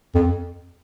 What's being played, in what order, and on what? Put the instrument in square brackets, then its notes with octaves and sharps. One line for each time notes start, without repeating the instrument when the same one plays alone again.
[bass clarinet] F2